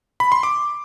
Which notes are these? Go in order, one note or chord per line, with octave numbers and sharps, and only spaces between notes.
B5
C6
D6